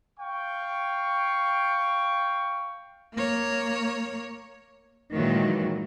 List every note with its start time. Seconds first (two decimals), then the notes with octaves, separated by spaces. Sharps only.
0.19 F5 G5 C#6
3.14 A#3 C#5
5.12 A#2 D#3 E3 F#3 G#3